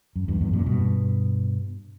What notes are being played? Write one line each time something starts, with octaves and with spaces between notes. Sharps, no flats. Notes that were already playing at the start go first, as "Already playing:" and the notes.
F#2
E2 G2
E2 G2
F#2 A#2
G2 B2